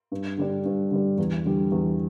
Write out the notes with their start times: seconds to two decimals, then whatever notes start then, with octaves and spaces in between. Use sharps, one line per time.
0.12 G2
0.38 D3 G3 D4
0.65 G2
0.91 D3 G3 D4
1.18 E2
1.45 D3 G3
1.72 E2